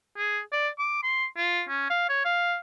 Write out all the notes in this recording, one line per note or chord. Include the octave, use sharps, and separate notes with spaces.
G#4
D5
D6
C6
F4
C#4
F5
C#5
F5